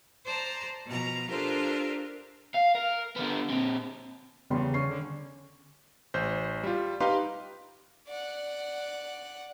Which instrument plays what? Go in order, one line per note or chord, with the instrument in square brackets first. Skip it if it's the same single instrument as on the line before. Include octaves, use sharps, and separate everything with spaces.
[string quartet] C5 D5 A5 A#5
B2 F3 A#5
D4 F4 G4 A4 A#4 C5
[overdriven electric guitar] F5
A#4
D3 B3
A#2 C4
[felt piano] E2 G3 C6 [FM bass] C#3
[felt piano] C#4 C#6 C7
[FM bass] D3
[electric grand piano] A1 C5 G6
G3 F4
D#4 G4 B4 F5 A#5 C6
[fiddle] D5 F#5